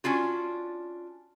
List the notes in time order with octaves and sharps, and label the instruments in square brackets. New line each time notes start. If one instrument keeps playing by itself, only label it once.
[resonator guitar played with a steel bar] C#4 D4 F4 F#4